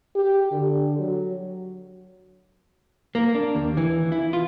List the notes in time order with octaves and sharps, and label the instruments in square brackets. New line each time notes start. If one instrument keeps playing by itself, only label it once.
[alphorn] G4
D3
F#3
[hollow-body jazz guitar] A#3
D4
D#2
E3
E4
F4